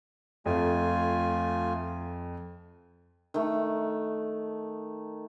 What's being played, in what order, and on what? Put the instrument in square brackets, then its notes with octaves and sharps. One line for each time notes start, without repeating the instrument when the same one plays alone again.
[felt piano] F2 [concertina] A3 F4 G#5
[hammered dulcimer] D#3 A3